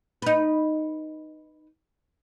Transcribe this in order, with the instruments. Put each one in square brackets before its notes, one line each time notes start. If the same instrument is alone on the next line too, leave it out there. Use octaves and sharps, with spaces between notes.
[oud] D#4 B4